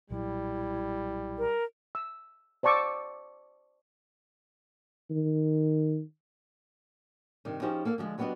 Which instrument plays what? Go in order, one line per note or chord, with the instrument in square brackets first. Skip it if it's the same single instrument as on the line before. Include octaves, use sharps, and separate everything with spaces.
[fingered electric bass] B1 A#2 F#3 [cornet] G3 [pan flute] E4
[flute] A#4
[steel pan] E6
C5 D5 A5 C#6 D6 E6
[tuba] D#3
[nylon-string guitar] G2 C3 D#3
F3 C#4 D#4 G4 G#4 C5
A#3 A4 F5
D3 F3 F#3 G#3
F#3 G3 B3 C#4 D4 D#5